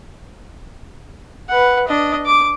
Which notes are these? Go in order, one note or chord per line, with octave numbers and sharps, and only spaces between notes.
B4 F#5
D4 D#5
D6